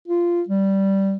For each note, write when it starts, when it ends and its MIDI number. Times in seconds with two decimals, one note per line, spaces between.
0.08 0.42 65
0.48 1.17 55